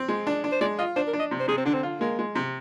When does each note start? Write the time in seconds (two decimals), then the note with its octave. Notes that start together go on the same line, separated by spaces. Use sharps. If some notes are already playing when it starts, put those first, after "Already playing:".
Already playing: C4
0.08 G#3
0.27 D4
0.44 D4
0.52 C5
0.61 G#3 D5
0.78 F4 D#5
0.96 D4 C5
1.07 A#4
1.13 D4
1.19 D#5
1.31 C3
1.40 C5
1.48 C3 G#4
1.57 C4
1.65 D3 D4
1.74 C4
1.83 F4
2.01 G#3 A#3
2.19 G#3
2.35 C3